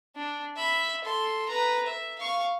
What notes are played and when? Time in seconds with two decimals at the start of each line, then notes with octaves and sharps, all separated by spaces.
0.16 D4
0.56 E5 B5
1.04 A4 C6
1.49 B4 A#5
1.86 E5
2.19 F5 C#6